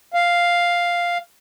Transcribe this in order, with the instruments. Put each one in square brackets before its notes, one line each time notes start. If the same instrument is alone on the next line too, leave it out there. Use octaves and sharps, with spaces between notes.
[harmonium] F5